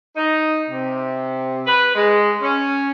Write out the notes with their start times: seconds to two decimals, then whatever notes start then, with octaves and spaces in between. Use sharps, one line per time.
0.16 D#4
0.69 C3
1.66 B4
1.95 G#3
2.41 C#4